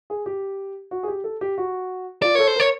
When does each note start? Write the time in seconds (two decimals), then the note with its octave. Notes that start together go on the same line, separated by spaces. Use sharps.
0.10 G#4
0.26 G4
0.91 F#4
1.03 G#4
1.08 G4
1.24 A4
1.41 G4
1.58 F#4
2.22 F4 D5
2.34 A4 A#4 C#5
2.47 C5
2.56 A#4 C#5